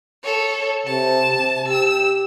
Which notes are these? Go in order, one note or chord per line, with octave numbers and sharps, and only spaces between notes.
A4 C#5
C3 A5
C3
G4 E6